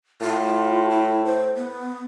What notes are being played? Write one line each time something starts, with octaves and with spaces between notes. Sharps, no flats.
A2 F4
E4
C5
B3